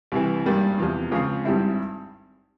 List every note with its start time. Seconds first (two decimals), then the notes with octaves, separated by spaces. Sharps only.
0.12 C2 C3 E3
0.46 G#1 G2 G3 A#3
0.78 E2 C3 F3 C4
1.11 C#2 C#3 F3 C4 F4
1.45 G#1 G2 G3 C4 E4